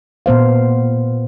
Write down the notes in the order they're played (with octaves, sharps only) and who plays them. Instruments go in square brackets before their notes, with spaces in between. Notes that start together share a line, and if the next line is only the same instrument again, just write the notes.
[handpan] A#2 B3 C5 F5